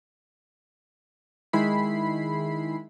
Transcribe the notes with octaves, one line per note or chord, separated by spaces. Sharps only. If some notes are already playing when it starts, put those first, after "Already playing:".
D#3 G#3 E4 B5 C7